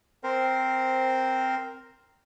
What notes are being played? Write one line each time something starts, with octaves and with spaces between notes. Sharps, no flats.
C4 A#4 C5